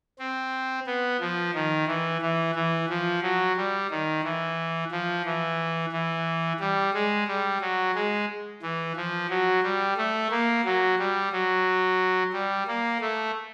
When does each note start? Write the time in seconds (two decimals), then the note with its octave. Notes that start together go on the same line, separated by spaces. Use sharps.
0.19 C4
0.87 B3
1.20 F3
1.54 D#3
1.88 E3
2.22 E3
2.55 E3
2.89 F3
3.22 F#3
3.57 G3
3.90 D#3
4.24 E3
4.91 F3
5.25 E3
5.92 E3
6.60 G3
6.93 G#3
7.28 G3
7.61 F#3
7.95 G#3
8.62 E3
8.96 F3
9.30 F#3
9.63 G3
9.97 A3
10.31 A#3
10.65 F#3
10.99 G3
11.32 F#3
12.33 G3
12.67 A#3
13.01 A3